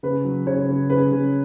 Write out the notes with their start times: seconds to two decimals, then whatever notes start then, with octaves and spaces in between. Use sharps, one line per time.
0.03 C#3 B4
0.24 F#3
0.47 C#3 C#5
0.68 C#3
0.90 C#3 B4
1.12 C#3